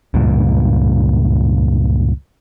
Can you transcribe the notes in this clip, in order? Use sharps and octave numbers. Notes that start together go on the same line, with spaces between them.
C#2 G2 A#2